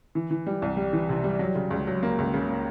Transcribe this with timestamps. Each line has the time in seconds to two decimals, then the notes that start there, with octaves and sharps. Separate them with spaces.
0.15 E3
0.31 E3
0.47 G3
0.62 C2
0.77 G3
0.93 E3
1.09 C3
1.24 G3
1.39 F#3
1.55 C#3
1.70 C#2
1.87 F#3
2.03 A#3
2.18 C#2
2.34 C#3
2.48 A#3